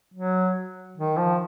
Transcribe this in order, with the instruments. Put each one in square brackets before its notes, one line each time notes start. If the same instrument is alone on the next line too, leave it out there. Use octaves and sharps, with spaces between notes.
[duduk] F#3
D#3
F3